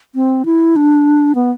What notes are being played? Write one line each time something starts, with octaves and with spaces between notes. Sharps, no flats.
C4
E4
D4
B3